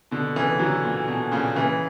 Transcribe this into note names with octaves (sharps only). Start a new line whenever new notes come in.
B2 D3
C#3 E3
D3 F#3
A#2
B2
A#2 C#3
C#3 E3